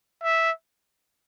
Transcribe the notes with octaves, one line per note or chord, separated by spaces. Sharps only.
E5